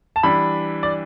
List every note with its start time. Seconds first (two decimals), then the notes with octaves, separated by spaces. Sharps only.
0.16 A5
0.23 E3 G3 D4 B5
0.83 D5